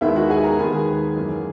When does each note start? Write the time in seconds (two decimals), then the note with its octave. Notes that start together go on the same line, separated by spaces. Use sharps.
0.01 D#2 D#3 G#3 B3 E4 E5
0.16 F#4 F#5
0.30 G#4 G#5
0.44 A#4 A#5
0.59 D#2 D#3 G#3 B3 G#4 G#5
1.16 F#2 E3 A#3